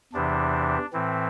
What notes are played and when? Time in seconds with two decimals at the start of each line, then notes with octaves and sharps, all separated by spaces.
0.13 E2 C3 E3 D4
0.93 A2 E3 C4